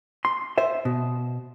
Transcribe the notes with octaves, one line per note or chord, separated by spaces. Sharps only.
C6
C5 E5
B2